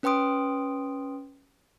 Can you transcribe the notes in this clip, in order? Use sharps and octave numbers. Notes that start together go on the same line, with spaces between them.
C#4 B4 G5 C6 D#6 D7